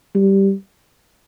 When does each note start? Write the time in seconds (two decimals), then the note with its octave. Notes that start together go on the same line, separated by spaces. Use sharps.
0.15 G3